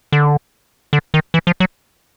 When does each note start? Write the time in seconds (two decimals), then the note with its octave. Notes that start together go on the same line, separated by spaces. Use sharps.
0.12 D3
0.93 D3
1.14 D#3
1.34 E3
1.47 F3
1.60 F#3